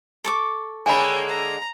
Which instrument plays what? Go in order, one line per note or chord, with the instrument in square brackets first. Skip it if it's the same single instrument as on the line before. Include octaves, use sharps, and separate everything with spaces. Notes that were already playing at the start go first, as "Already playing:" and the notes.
[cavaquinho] A4 C#6 D6
[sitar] D3 G#3 A#3 [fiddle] C#5 G5 [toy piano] G#5 B5
[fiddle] A#5